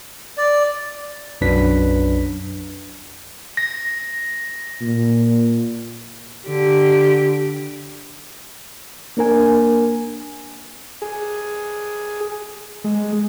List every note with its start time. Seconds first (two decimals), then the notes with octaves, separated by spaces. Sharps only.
0.38 D5
1.41 B1 F#2 F#3 D4 B4 B6
3.57 A#6
4.81 A#2
6.47 D3 G4
9.17 A#3 D4 A#4 G#5
11.02 G#4
12.84 G#3